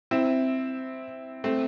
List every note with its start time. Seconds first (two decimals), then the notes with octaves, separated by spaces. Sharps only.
0.11 C4 E4
1.44 A3 C4